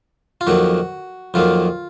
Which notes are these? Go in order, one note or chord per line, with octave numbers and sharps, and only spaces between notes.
F4
F2 D#3 F#3 A#3 F#4
F2 D#3 F#3 A#3 F4